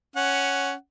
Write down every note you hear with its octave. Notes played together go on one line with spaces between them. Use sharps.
C#4 F#5